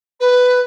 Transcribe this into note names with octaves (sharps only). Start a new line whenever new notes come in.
B4